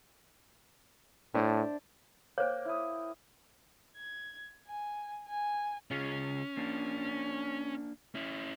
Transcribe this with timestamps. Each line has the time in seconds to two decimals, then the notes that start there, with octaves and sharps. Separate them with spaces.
1.35 A2 D4 C5 E5
2.38 A#3 C5 C#5 G5
2.65 E4 D#6
3.96 G#6
4.67 G#5
5.27 G#5
5.91 C#3 C#4 F4 G#4
6.57 A#3 D4
8.15 C#4 E4